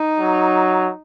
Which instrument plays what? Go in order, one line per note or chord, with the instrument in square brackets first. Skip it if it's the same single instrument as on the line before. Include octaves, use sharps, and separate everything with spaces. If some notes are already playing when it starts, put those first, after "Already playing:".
Already playing: [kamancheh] D#4
[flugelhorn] F#3